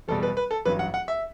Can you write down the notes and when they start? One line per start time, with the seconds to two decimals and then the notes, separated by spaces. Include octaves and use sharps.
0.08 F#1 E2 B2 G3 A4
0.23 B4
0.37 B4
0.51 A4
0.65 A1 G2 F#3 B4
0.79 F#5
0.94 F#5
1.08 E5